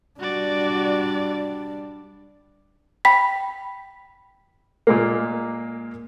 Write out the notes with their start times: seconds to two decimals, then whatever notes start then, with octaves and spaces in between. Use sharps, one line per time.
0.20 G3 D4 F#4 D5
3.05 G5 B5 B6
4.87 A#2 G#3 A#3